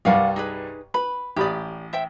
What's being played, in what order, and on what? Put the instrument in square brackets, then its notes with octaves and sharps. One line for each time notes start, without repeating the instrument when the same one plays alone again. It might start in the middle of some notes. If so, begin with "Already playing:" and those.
[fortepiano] C2 G2 G3 [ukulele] A#4 F5 F#5
[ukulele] D#4 G#4 B4
[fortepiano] B4 [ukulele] B5
[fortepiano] A1 B5 D#6 [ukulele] G4 D5
[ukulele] C5 E5 G5